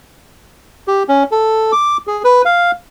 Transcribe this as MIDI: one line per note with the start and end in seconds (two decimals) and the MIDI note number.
0.88 1.03 67
1.09 1.23 61
1.32 1.72 69
1.72 1.97 86
2.07 2.22 68
2.24 2.42 71
2.45 2.71 77